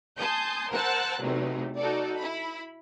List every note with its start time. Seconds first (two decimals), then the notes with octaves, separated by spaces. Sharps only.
0.18 G#5 A5 C6 D#6 G6
0.71 A#4 C5 F#5 A5 E6 F#6
1.21 E2 C3 F#3 A3 D#4
1.78 D#4 F#4 A4 D5
2.18 E4 B5